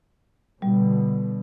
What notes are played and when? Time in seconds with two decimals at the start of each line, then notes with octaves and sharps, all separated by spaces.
0.62 B2 D3 G3